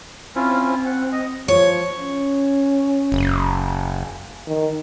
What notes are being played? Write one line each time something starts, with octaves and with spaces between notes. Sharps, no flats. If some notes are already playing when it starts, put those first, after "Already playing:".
C4 C#4 E4 F4
F#5
D#5
F3 C#5
C#4
F#1
D#3